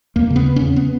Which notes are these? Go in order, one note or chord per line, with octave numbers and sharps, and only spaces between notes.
E2 A#3
C#3
B3
E2
C#4
C#3
B3